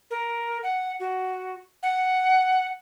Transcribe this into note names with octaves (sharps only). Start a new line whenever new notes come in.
A#4
F#5
F#4
F#5